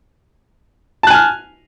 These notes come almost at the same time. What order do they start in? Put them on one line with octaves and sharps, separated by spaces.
A5 F#6 G#5 F6